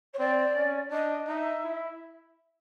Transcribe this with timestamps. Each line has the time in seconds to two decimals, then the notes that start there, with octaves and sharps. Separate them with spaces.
0.13 C#5
0.19 C4 D5
0.55 C#4
0.91 D4 D#5
1.27 D#4 E5
1.64 E4